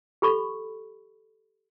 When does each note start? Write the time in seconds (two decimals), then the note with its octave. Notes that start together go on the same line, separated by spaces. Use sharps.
0.22 G4 A4 B5 C#6